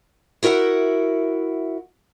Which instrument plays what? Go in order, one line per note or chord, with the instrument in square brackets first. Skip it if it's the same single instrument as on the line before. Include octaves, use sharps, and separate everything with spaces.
[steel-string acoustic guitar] E4 F#4 A#4 E5 F#5